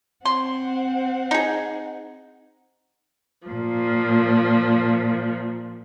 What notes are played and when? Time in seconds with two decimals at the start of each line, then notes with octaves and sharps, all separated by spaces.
0.25 C4 F#5 C6
1.31 D#4 G#4
3.48 A#2 F3